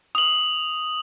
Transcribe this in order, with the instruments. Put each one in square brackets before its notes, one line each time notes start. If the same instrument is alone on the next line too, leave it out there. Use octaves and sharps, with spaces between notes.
[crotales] D#6 F#7